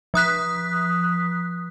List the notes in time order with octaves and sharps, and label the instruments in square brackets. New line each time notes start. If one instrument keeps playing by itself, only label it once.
[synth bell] F3 D#6 F#6 B6